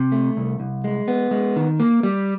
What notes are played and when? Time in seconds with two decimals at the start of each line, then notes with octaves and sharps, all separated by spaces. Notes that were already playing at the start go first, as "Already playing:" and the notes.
Already playing: C3
0.12 A3
0.37 C2
0.60 C2
0.84 G#3
1.08 B3
1.31 G#3
1.56 D#3
1.80 A#3
2.03 G3